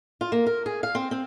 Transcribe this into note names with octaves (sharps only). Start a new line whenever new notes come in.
F4
A#3
A#4
G#4
F5
C4
C4